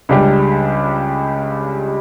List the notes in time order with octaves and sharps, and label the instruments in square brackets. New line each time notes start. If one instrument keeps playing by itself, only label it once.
[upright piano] C#2 C#3 G3 D4 G4